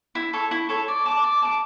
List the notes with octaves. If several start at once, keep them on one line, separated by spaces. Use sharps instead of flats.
E4
A4 C#5
E4
A4 C#5
D5
A5 D6
D5
A5 D6